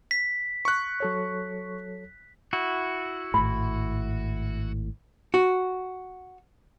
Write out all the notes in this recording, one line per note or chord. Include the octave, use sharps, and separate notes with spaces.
B6
C#6 F#6
F#3 A4 C#5
E4 F#4
G#1 A2 B5
F#4